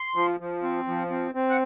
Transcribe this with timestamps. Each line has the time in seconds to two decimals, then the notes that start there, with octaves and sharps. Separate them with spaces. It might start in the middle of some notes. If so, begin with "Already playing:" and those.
Already playing: C6
0.16 F3
0.40 F3
0.63 C4
0.87 F3
1.10 C4
1.35 C4
1.49 F#5